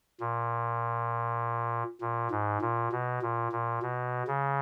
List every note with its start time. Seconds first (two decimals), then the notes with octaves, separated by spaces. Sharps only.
0.20 A#2
2.01 A#2
2.31 G#2
2.61 A#2
2.92 B2
3.22 A#2
3.52 A#2
3.82 B2
4.28 C#3